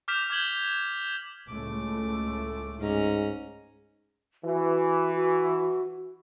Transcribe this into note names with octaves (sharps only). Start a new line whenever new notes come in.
D6 F6 G6 B6 E7 F7
D6 G6 G#6 F#7 G7
C#2 A2 A3 D6
G#2 C#4 A#5
E3 F#4
F#4